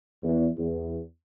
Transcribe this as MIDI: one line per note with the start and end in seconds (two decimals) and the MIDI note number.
0.23 0.48 40
0.58 1.00 40